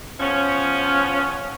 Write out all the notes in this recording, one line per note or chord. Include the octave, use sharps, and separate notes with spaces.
F3 B3 C#4